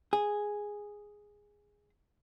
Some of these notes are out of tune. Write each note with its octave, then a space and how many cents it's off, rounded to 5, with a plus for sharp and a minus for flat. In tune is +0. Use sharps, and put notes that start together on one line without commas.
G#4 -5